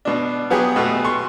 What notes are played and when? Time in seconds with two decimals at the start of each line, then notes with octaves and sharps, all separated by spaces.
0.05 B2 D4
0.50 F#3 B3 G4 G#4
0.76 B2 A3
1.05 C6 C#6